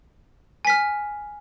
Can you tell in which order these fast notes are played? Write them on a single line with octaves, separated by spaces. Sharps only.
G#5 B6 F6